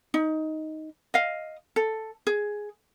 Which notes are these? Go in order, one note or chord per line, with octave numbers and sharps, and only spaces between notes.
D#4
D#5 F5
A4
G#4